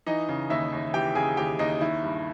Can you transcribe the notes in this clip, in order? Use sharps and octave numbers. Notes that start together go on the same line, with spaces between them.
E3 D#4 D#5
C#3
D#2 E4 E5
D#2
E3 G4 G5
C#3 G#4 G#5
D#2 G4 G5
D#2 D#4 D#5
D#3 E4
G2